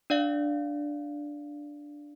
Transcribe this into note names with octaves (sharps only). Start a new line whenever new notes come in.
D4 D5 F5